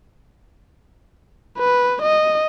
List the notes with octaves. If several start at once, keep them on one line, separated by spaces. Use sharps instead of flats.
B4
D#5